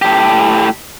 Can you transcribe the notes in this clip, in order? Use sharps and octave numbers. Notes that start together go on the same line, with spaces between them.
A2 G4